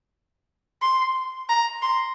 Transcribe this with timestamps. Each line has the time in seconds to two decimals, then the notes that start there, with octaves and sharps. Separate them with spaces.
0.82 C6
1.49 A#5
1.82 C6